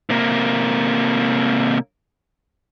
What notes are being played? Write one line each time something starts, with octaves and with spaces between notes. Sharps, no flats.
C3 A#3